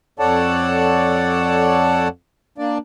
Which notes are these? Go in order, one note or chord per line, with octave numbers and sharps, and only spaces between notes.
F2 A4 C#5 D5 F#5 A5
A#3 D4 D5